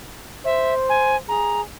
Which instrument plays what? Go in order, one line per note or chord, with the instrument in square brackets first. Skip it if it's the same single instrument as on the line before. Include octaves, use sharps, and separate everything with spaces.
[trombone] C5 [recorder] E5
[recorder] G#5
[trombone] G#4 [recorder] A#5